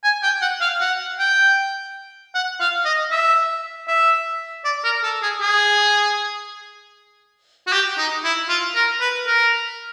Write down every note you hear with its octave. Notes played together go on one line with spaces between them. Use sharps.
G#5
G5
F#5
F5
F#5
G5
F#5
F5
D#5
E5
E5
D5
A#4
A4
G#4
G#4
F#4
G4
D#4
E4
F4
A#4
B4
A#4